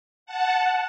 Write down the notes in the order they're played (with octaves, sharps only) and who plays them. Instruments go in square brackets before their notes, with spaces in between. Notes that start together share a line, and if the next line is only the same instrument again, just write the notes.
[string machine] F#5 A5